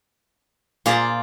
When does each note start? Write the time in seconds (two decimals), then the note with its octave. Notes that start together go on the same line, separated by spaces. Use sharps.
0.86 A#2 F4 G#4 C5 D5 A#5